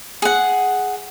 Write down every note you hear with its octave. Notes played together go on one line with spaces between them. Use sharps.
G#4 F#5